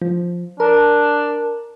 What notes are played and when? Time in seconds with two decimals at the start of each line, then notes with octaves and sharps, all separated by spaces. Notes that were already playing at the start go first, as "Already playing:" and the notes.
0.02 F3
0.60 D4 A#4